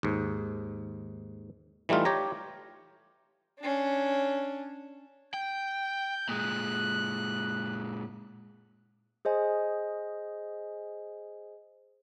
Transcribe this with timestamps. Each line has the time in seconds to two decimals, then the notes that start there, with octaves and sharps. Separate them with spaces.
0.03 D#2 G#2
1.89 E3 G3 A3 D#4 F4
2.05 G4 C#5 A#5
3.60 C#4 D4
5.34 G5 G6
6.29 A#2 G#3 F#6
9.25 G#4 C5 D#5 G#5